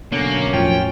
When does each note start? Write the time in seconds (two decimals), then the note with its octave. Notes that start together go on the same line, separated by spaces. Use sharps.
0.13 F#2 B2 D3 A#3 C#4 C#5
0.53 E2 A2 E3 F3 G5